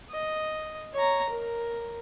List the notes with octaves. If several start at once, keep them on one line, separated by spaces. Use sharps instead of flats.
D#5
C#5 A#5
A#4